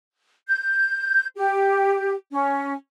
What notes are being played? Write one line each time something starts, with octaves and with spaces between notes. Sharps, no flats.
G6
G4
C#4